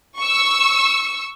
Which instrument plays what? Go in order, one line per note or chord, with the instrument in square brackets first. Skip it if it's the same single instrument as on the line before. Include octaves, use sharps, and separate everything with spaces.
[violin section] C#6 E6